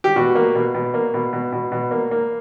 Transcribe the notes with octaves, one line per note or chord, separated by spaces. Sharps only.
G4
B2 F#4
A#3
B2
B2
A#3
B2
B2
B2
B2
A#3
A#3